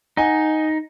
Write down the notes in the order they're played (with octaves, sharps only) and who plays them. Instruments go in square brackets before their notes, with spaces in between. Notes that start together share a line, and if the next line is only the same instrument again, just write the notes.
[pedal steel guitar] D#4 [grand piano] D#5 F#5 G#5